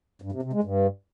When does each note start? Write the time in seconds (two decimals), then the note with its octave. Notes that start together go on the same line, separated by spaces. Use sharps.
0.22 G2
0.32 C3
0.43 C3
0.53 G#3
0.63 G2